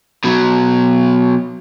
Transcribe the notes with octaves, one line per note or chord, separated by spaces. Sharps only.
B2 F#3